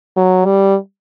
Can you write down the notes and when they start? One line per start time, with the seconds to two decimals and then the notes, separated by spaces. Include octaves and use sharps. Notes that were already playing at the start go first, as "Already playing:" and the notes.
0.17 F#3
0.45 G3